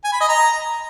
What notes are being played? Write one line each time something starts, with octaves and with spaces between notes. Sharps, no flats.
G#5
B5
D#5
A#5